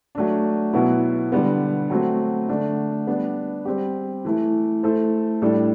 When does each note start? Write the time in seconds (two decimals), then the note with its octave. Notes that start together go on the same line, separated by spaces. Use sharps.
0.15 F#3 A3 D4
0.73 B2 F#3 B3 E4
1.32 D3 G3 B3
1.90 F#3 A3 C4 F#4
2.48 D3 A3 D4
3.07 G3 B3 D4
3.65 G3 C4 G4
4.25 E3 A3 E4
4.83 A3 E4 A4 C5
5.42 A2 G3 D4 A4